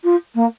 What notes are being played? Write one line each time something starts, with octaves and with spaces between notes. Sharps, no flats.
F4
A#3